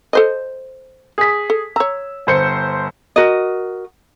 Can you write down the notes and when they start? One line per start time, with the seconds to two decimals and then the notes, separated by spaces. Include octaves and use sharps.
0.13 A4 C5 D#5
1.18 G#4 B6
1.50 A4
1.76 C#5 A#5 E6
2.27 G1 C5 C#7
3.16 F#4 A#4 D#5